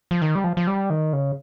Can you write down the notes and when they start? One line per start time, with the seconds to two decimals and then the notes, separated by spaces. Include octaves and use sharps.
0.11 F3
0.22 D#3
0.35 G3
0.44 F3
0.57 F3
0.67 G3
0.90 D#3
1.13 C#3